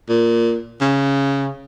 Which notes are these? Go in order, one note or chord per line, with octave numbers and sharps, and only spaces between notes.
A#2
C#3